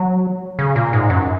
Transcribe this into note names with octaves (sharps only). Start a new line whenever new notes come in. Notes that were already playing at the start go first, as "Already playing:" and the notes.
Already playing: F#3
C#3
A#2
G#2
F#2